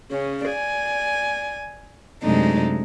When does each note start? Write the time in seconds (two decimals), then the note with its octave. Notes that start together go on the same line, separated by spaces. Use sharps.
0.11 C#3 C#4
0.45 D5 G#5
2.23 F#2 C3 G#3 A3 D4 D#4